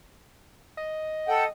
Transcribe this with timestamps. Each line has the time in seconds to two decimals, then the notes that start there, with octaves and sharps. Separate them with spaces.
0.77 D#5
1.28 A4 F#5 G5